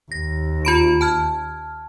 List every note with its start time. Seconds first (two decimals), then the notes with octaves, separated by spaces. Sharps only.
0.12 D#2 A#6
0.65 F4 B5 D7
1.01 A5 F6 G#6